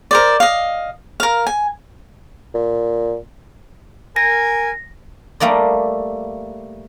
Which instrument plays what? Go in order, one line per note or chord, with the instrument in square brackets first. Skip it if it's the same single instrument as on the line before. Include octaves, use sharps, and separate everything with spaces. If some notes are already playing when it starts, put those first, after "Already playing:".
[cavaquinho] A#4 C5 D5
D#5 F5
A#4 F5
G#5
[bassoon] A#2
[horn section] A#4 G#5 [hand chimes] A#6
[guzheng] G3 A3 A#3 D5 D#5